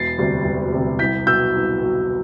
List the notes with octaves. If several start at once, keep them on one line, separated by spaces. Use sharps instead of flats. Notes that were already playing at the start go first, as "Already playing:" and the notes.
Already playing: E1 A6 C7
D2 C3 G3
E1
D2 C3 G3
C2 G6 B6
B2 F#3 E6 G6
C2
B2 F#3